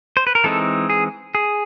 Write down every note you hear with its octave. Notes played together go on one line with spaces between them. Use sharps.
C5
B4
A#4
E3 G#3 C4 D#4 A4
G#4
G#4